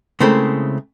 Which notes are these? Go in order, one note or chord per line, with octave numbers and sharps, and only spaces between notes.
C#3 G#3 A3 C4 E4 A#4